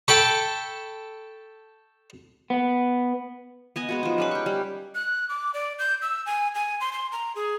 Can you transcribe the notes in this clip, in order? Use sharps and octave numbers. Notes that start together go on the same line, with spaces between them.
A4 G5 A5 B5 C#6
B3
B3 D#5 G#5
G#3 B3 F#4
F3 D#4
G3 C#4 B4
G5 C#6
G3
F#6
D6
D5
G6
E6
G#5
G#5
C6
C6
A#5
G#4